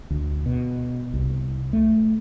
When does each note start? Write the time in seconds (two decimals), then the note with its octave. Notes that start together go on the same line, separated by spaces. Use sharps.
0.10 D2
0.46 B2
1.14 C2
1.73 A3